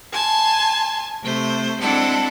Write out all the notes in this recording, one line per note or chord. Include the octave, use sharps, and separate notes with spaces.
G#5 A5 C6
C3 A3 C5
G#3 C4 D4 E4 A4 F#5